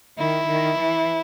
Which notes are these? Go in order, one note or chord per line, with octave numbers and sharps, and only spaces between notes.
D#3 E4
D#3
E3